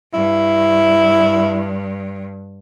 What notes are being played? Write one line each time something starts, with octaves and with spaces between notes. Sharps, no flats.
G2 E4